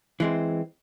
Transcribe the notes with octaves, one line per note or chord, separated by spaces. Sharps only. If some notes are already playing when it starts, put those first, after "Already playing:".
E3 G#3 C4